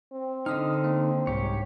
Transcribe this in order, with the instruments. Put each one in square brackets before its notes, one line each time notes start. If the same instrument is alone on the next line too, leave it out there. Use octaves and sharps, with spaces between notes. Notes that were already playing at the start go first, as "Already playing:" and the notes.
[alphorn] C4
[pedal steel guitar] D3 D#4 [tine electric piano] D#5 D#6 F6
[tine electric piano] A#3
[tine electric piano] C2 G#2 [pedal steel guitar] G4 C#5